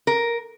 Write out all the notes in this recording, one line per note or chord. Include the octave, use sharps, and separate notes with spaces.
A#4